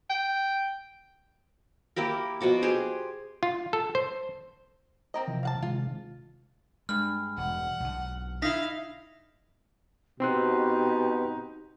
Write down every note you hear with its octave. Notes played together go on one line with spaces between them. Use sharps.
G5
A#3 E4 G4 A#4
B2 F3 F#4 D6
G4 G#4 C5
F4
A4
C5
C4 A#4 D#5
C3 E3 F3
F5 F#5 A5
C3 D#3 G#3 F4
G2 G#3 F6
E1 F#5
B1 D3
D#4 E4 F5 A#6 B6
B2 C4 D#4 G4 C6 F#6